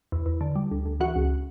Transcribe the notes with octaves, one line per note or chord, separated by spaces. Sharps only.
E2
E2
D3
G3
D2
D2
E3 F#4 F#5
C#2